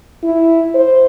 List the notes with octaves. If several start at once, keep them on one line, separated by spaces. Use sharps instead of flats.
E4
C5